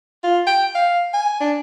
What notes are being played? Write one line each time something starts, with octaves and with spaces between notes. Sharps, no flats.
F4
G5
F5
G#5
D4